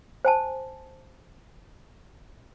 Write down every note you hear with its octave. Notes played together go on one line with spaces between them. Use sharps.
C5 G#5 A5